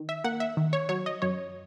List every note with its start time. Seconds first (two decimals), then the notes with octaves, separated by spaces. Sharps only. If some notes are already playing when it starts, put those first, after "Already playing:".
Already playing: D#3
0.09 E5
0.24 A#3 F#5
0.40 E5
0.57 D#3
0.73 C#5
0.89 F#3 C#5
1.06 D#5
1.22 F#2 C#5